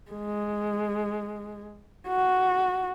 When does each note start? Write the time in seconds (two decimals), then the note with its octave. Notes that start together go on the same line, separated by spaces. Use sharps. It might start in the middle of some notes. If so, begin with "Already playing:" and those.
0.11 G#3
2.08 F#4